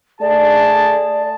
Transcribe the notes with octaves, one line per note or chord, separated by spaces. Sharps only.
A3 G#4 D5 A5